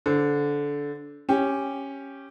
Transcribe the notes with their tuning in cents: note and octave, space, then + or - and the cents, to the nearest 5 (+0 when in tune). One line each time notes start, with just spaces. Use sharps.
D3 -20 C5 +0
C#4 -10 G4 +0